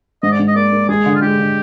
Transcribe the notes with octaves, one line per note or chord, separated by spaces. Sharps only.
G#2 D#5
D5
G#2
D#5
A#3 D5
A#3
G#3 G#4
D3
F4
G#3 G4
D3